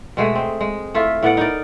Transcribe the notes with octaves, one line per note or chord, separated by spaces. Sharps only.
B2 G#3 A3 G#4
C4
G#3
A3 E4 F4
A2 B3 D5 F#5
D#4 A#4 D5